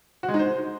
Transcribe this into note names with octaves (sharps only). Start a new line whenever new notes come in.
F#4
G#3
D#4
C5